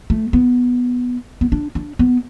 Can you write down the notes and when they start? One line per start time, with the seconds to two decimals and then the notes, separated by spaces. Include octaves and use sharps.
0.10 A3
0.33 B3
1.41 B3
1.52 D4
1.75 D4
1.99 B3